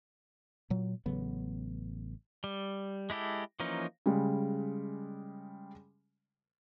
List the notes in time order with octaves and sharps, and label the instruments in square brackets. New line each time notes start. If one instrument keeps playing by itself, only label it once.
[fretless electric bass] A#2 F#3
A1 C#3 F#3 B3
[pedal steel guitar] G3
G#3 E4 G4 A4
E3 F3 A#3 C#4 D#4
[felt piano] C#3 G3 G#3